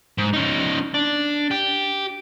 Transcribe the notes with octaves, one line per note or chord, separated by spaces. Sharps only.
G#2
C#4 D#4
D4
G4